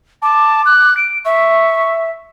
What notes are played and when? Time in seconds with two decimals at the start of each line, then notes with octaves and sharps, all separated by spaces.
0.22 A5 D6
0.66 F#6
0.97 D7
1.25 E5 C#6